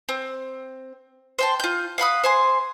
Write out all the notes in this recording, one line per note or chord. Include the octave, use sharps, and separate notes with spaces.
C4
C5 G5 A5
F4 G6
F5 F#5 B5 D#6
C5 G#5 C6